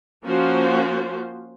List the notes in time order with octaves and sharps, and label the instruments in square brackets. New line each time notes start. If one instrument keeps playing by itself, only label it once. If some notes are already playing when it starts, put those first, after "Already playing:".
[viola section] F3 A#3 C#4 F4 F#4 C5